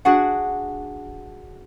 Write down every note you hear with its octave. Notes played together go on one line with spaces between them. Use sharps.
D4 F#4 G#4 F#5